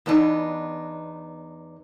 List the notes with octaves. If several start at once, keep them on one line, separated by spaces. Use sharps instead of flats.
E2 B3 D4 D#4